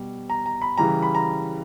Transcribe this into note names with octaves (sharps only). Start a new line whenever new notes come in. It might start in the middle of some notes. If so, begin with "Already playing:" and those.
Already playing: B2 G3
A#5
A#5
B5
C#3 E3 G3 A#5
B5
A#5